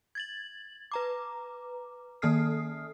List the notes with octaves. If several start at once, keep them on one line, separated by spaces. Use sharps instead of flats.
G#6 A6 F#7
B4 A#5 D6
D#3 A#3 A4 D#6 F6 C7